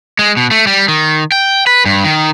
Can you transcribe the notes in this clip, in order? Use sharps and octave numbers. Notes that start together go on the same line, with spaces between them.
G#3
B2
A3
G3
D#3
G5
B4
G2
D#3